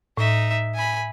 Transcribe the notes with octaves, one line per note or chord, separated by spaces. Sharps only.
A2 D#4 E5
G#5 B5